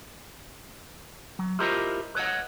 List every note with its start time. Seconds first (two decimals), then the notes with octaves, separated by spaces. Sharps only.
1.39 F#3
1.59 E4 F4 G4 A#4 C5 D#5
2.15 B4 C#5 D#5 F#5